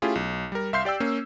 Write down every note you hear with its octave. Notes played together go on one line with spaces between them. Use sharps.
A3 C#4 E4 F4 G4 G#4
B1
G3 A#4
C2 E5 F5 C6 G6 C7
G4 D5 G5 E6
A#3 C#4